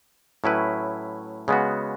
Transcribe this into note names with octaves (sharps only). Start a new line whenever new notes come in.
A2 F#3 C#4 E4 B4
C#3 G#3 B3 F#4